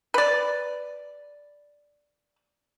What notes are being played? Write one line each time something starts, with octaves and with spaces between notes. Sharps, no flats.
B4 D5